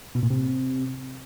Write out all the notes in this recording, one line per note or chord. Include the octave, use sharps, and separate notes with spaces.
B2
A#2
C3